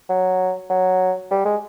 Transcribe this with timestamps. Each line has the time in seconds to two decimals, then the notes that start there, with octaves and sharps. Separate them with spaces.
0.09 F#3
0.70 F#3
1.31 G3
1.45 G#3